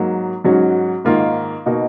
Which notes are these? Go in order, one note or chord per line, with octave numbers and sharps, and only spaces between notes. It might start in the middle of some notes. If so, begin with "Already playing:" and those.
Already playing: G#2 F#3 A#3
G#2 F#3 C#4 F#4
G#2 D#3 A#3 F4
B2 A#3 D#4 F#4